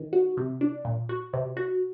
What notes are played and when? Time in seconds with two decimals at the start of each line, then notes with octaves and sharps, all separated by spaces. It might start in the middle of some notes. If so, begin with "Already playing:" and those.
Already playing: D#3
0.13 F#4
0.37 C3
0.61 D4
0.85 A#2
1.09 F#4
1.33 C3
1.57 F#4